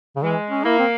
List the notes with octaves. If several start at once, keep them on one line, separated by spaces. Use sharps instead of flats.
C#3
E3 G#3
C#4
A#3 E4
C4